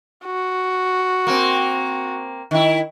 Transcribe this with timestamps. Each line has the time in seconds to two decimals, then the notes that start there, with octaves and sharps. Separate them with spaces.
0.26 F#4
1.27 A#3 C4
2.51 D#3 E4